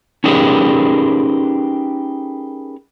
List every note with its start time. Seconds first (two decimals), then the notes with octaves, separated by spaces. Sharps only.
0.24 C#4 D#4 G4 G#4 A#4 B4